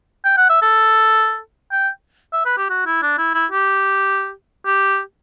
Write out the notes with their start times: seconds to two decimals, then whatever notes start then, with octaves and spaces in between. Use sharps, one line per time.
0.25 G5
0.37 F#5
0.49 E5
0.62 A4
1.71 G5
2.33 E5
2.45 B4
2.57 G4
2.70 F#4
2.86 E4
3.02 D4
3.18 E4
3.34 E4
3.51 G4
4.66 G4